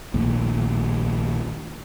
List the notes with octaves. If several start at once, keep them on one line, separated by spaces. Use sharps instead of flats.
A#1 D#2 A2